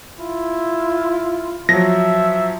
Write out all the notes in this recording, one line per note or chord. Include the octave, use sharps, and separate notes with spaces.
E4 F4
F3 F#3 E5 A#6